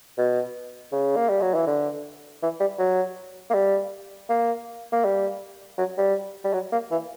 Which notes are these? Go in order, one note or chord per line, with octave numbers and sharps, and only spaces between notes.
B2
C#3
A#3
G3
F#3
E3
D3
E3
G3
F#3
A#3
G3
A#3
A#3
G3
F#3
G3
G3
F#3
A#3
E3